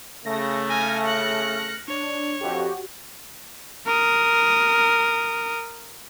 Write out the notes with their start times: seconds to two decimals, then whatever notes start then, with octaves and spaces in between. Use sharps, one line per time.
0.26 C#3 A3 A#6
0.69 G#5 F6 A#6
1.07 F#6 C#7
1.88 D4 C#5
2.41 F2 F#4 G4
3.86 A#4 D#6